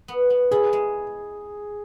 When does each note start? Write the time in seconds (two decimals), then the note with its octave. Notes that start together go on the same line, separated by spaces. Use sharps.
0.08 B3
0.30 B3
0.51 E4 G#4
0.73 G#3